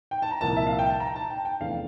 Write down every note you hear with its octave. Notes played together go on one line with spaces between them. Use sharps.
G5
A5
A#5
C2 A#2 F3 A#3 A5
E5
F5
G5
A5
A#5
A5
G5
G5
F1 E2 E3 A3 D4 F5